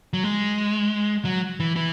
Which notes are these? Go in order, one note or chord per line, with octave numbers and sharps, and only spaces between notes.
F#3
G#3
F#3
E3
E3